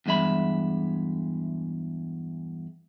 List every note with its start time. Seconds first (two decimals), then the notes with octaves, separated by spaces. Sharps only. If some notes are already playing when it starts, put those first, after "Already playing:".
0.06 E2 G2 G#3 E5 B5